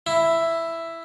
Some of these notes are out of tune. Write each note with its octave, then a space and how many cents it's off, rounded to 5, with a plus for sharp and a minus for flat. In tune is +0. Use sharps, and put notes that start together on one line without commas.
E4 +5